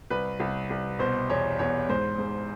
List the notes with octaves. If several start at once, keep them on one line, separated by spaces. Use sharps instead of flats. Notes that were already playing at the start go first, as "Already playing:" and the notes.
C2 B4
C2
C2
B2 C5
E2 C#5
E2 C#5
G#2 C5
G#2